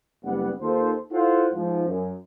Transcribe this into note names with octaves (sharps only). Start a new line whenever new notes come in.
F#1 G3 B3 F#5
D#2 D#3 F4 A4 C5
E4 F4 A4 C5 F5 F#5
G#2 F3
F#2